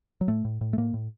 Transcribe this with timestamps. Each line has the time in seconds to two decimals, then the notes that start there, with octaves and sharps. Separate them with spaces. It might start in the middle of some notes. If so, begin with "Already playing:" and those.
0.21 F#3
0.28 A2 A3
0.45 A2
0.61 A2
0.73 A3
0.78 A2 A#3
0.94 A2